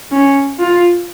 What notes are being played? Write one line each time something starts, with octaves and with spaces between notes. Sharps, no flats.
C#4
F4